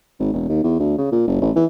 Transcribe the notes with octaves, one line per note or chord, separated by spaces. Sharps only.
G#1
E1
D#2
E2
D2
C#3
A#2
F#1
A1
E3